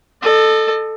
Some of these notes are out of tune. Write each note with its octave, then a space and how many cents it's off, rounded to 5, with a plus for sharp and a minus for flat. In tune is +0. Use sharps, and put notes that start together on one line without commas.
A4 +0 D#5 -35